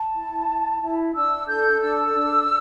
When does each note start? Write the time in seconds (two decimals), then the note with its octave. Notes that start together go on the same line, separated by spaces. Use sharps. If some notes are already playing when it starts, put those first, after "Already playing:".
Already playing: A5
0.16 E4
0.49 E4
0.82 E4
1.14 D4 E6
1.48 A4 G6
1.81 D4 E6
2.14 D4